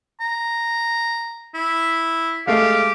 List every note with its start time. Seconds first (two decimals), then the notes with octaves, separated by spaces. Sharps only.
0.21 A#5
1.55 E4
2.47 G#3 A3 G4 F5